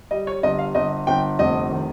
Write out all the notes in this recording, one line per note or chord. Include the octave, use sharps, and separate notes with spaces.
G3 D#5
C#5
G1 D#5
F5
G1 D#5
G1 G5
F1 D#5
D#3